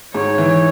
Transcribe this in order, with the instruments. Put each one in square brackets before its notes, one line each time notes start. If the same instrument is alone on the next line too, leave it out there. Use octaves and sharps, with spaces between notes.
[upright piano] G#2 [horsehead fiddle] C#5
[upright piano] E3